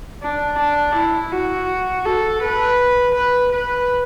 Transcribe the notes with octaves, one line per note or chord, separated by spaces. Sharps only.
D4
D4
E4
F#4
A4
B4
B4
B4